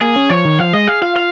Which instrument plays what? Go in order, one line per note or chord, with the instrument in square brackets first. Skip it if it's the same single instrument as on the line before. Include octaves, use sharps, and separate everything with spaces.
[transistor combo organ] A#3 [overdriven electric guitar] G#4
[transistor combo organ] C#4
[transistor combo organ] F3 [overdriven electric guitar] C#5
[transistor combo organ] D#3
[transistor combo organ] F3 [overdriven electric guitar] F5
[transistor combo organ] G#3 [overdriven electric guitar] D#5
[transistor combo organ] G#4 [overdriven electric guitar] F5
[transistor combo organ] F4 [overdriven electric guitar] F5
[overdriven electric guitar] F5